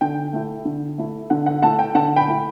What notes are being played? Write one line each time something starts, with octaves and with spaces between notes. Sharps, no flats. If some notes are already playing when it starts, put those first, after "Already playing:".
D3 G5
A3 E4
D3
A3 E4
D3 F#5
F#5
A3 E4 F#5 A5
G5
D3 F#5 A5
G5 B5
A3 E4